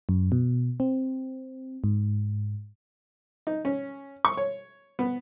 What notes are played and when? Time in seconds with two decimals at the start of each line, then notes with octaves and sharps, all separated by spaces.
0.09 F#2
0.32 B2
0.80 C4
1.84 G#2
3.47 D#4
3.65 C#4
4.25 C#6
4.37 C#5
4.99 B3